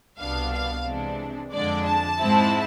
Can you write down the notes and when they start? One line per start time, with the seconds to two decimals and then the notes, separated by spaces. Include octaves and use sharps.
0.18 C2 B2 B3 D4 F5
0.53 F5
0.85 C3 E3 G#3 D4
1.52 F2 D3 G#3 D4 D5
1.85 A5
2.19 G#2 G#3 C4 E4